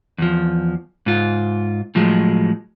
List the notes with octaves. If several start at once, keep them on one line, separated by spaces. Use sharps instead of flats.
E2 F3
G#2 F4
A2 F3 F#3 G#3